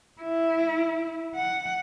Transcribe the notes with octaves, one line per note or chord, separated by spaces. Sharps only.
E4
F#5